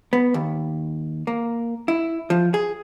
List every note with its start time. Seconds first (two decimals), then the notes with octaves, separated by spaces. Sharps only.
0.13 B3
0.34 D#2
1.27 A#3
1.88 E4
2.30 F3
2.54 G#4